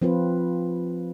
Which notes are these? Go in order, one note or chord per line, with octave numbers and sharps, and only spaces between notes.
F3 C4 F4 B4